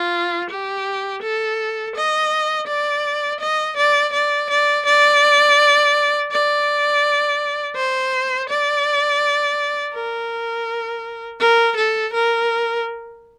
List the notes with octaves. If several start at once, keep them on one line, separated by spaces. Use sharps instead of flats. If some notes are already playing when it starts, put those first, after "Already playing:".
Already playing: F4
G4
A4
D#5
D5
D#5
D5
D5
D5
D5
D5
C5
D5
A#4
A#4
A4
A#4